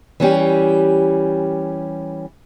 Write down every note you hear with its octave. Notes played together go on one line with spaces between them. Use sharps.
E3 G3 C#4 G4